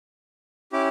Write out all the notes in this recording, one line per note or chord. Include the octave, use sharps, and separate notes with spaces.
C#4 E4 G4 D6